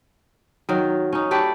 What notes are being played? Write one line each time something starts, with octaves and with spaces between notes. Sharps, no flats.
D#3 F#3
C#4 D#4
A3 G4 B4 D5